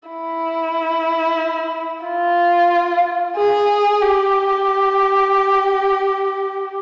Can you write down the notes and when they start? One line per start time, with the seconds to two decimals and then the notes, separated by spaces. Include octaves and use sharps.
0.09 E4
2.05 F4
3.36 G#4
4.02 G4